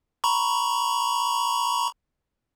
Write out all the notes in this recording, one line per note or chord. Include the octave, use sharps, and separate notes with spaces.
A#5 B5 C#6